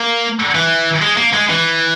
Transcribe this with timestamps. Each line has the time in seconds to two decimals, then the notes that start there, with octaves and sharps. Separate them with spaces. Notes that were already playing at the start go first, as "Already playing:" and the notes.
Already playing: A#3
0.55 E3
1.02 G#3
1.17 A#3
1.33 G#3
1.50 E3